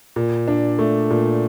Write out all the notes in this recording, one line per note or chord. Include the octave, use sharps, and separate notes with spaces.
A#2
D4
A3
A#2